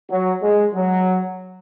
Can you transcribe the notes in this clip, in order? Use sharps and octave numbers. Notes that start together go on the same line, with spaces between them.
F#3
G#3
F#3